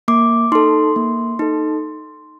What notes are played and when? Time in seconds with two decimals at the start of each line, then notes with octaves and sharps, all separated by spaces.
0.08 A#3 D6
0.52 D#4 A4 C6
0.96 A#3
1.39 D#4 A4